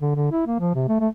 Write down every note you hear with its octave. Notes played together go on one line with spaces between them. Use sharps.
D3
D3
E4
A#3
F3
C3
A3
A3